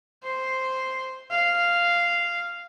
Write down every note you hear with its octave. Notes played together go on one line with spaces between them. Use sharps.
C5
F5